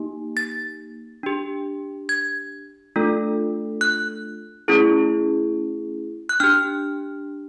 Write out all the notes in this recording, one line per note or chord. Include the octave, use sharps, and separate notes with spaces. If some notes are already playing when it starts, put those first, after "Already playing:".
Already playing: A#3 D#4 G4
A6
D4 G4
G#6
A3 D4 F4 A4
F#6
A3 C#4 E4 G#4
F#6
D4 G4 F6